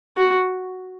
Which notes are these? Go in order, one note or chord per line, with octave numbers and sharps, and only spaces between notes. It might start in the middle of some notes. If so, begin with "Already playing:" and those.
F#4